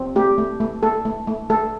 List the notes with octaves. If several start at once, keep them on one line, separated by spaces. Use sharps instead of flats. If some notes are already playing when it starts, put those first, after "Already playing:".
Already playing: C4
A3 G4
A3
A3
A3 A4
A3
A3
A3 A4